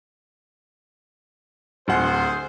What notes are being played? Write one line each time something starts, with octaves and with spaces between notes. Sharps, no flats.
D1 G#4 C5 F#5 F#6